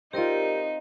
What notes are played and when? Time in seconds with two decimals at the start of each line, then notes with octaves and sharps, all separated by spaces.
0.13 C4 D#4 F4 G4 A#4 D5